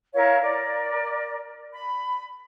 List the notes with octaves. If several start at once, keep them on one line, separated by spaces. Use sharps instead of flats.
E4 A#4 C#5 F5
A#4 D5
B5